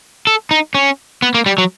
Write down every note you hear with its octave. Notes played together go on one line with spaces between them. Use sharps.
A4
D#4
C#4
B3
A#3
G3
F#3